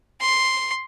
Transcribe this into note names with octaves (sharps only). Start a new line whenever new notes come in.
C6